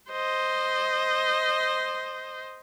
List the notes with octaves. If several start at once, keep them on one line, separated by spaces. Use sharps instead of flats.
C5 D#5